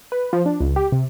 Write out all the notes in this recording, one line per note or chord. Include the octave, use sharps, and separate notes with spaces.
B4
F3
D4
C#2
G4
C3